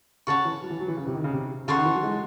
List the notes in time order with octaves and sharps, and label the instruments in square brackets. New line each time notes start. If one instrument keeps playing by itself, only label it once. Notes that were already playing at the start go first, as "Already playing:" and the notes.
[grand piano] C#3 [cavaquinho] C#5 F#5 A5 C#6
[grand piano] E3
F#3
E3
F#3
E3
C#3
C3
D#3
C#3
C3
[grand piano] C#3 [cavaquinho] A4 C#5 F#5 C6
[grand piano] D#3
E3
F#3
G#3